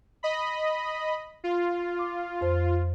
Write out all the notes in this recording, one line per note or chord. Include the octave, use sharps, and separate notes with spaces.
D#5 B5
F4
D6
F2 C5